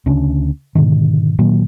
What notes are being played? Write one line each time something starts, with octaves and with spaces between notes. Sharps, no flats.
D2 C#3 C#4 D4
G#2 B2 D3 D#3
A#2 D#3 F#3 A#3